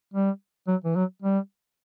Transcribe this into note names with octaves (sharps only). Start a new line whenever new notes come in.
G3
F#3
E3
F#3
G3